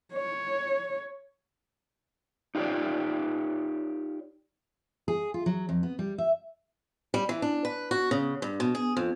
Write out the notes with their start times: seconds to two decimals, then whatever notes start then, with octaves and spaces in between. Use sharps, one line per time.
0.13 C#5
2.55 D#4 F4 G4 A#4 C#5 D5
5.08 G#4
5.34 F4
5.46 F#3
5.69 F2
5.83 B3
5.99 G3
6.18 E5
7.14 G3
7.29 E3
7.42 D4
7.65 B4
7.91 F#4
8.11 C#3
8.42 G2
8.60 B2
8.75 G#4
8.97 F2